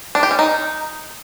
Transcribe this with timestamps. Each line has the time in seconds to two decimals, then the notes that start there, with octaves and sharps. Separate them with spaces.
0.15 D4
0.23 G4
0.31 C#4
0.39 D#4